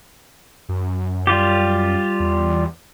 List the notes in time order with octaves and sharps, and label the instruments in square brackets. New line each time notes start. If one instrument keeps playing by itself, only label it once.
[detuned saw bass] F#2
[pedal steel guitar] G3 F4 G4
[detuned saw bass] E2